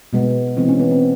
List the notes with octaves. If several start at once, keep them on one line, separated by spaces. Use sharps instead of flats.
B2 G#3 B3
E3 G#3 B3 C4
C#4
B3
C4